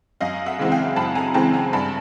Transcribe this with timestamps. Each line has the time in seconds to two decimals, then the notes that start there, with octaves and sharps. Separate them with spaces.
0.21 F#2 D#5 F5
0.46 E5 F#5
0.59 C#3 E3 G#3 C4
0.72 F5 G5
0.96 F#2 A5 B5
1.15 G#5 A#5
1.34 C#3 E3 G#3 C4 G5 A5
1.53 G#5 A#5
1.73 G2 A5 B5